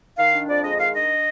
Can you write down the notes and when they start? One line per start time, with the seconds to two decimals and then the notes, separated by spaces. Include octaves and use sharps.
0.18 D#3 F5
0.34 D4
0.49 F2 D5
0.64 G#3 D#5
0.79 D#3 F5
0.93 D4 D#5